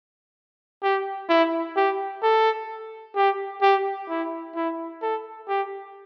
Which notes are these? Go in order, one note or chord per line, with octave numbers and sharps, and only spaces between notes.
G4
E4
G4
A4
G4
G4
E4
E4
A4
G4